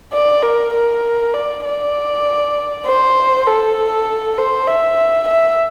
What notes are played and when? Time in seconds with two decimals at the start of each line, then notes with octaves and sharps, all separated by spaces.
0.13 D5
0.43 A#4
0.73 A#4
1.34 D5
1.64 D5
2.85 C5
3.47 A4
4.38 C5
4.67 E5
5.28 E5